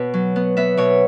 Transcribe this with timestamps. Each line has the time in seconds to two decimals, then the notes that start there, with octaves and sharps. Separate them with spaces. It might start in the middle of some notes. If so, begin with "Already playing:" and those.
Already playing: B2 B3 C#5
0.14 F#3
0.36 B3
0.57 B3 E5
0.77 B2 C#5